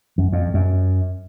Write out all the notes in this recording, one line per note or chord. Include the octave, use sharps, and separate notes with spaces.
F#2
F2
F#2